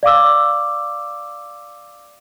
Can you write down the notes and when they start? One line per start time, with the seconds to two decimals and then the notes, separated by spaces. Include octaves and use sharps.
0.03 D5 F5 D6 E6